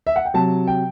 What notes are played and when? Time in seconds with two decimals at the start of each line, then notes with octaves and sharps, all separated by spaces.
0.07 E5
0.16 F#5
0.25 G5
0.34 C3 F#3 A5
0.67 G5